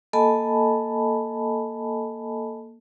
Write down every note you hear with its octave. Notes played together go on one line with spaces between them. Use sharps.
A#3 A4 D#5 G#5 A5 B5